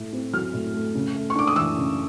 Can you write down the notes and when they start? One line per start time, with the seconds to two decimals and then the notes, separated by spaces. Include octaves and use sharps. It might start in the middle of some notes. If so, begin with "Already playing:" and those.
Already playing: A2 A3
0.13 C4
0.33 F#3 F6
0.53 A2
0.74 A3
0.94 C#3
1.15 A3
1.30 C#6
1.35 D4 D6
1.47 D#6
1.56 E3 E6
1.77 C#3